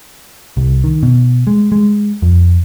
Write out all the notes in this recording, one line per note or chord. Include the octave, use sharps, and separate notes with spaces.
C2
D#3
B2
G#3
G#3
F2